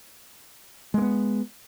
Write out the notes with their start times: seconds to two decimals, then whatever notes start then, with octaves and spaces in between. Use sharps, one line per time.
0.94 G#3
0.98 A#3
1.02 B3